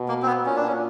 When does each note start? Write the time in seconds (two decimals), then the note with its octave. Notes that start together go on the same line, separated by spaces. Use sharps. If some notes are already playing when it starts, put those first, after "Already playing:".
Already playing: B2
0.08 A#3
0.22 C4
0.27 B3
0.45 A#2 C#4
0.56 D4
0.68 C#4